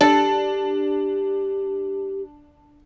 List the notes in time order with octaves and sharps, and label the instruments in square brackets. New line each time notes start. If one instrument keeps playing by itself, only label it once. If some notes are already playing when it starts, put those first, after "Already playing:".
[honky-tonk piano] D4 [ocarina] G4 [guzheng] A4